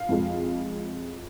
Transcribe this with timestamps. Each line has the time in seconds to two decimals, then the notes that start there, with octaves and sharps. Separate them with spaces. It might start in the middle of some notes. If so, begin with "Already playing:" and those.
Already playing: F5
0.09 F2 F3 G#3